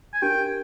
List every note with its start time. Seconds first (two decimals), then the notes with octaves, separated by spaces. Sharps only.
0.13 G#5
0.22 D4 G4 A#4 G5